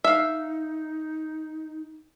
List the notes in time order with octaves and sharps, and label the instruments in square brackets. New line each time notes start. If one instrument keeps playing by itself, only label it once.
[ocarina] D#4 [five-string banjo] E5 F5